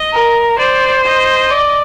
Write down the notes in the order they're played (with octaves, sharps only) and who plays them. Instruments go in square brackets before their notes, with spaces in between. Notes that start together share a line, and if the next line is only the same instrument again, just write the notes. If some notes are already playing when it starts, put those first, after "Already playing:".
Already playing: [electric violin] D#5
[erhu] A#4
[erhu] C5 [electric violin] D5
[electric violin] D#5
[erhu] D5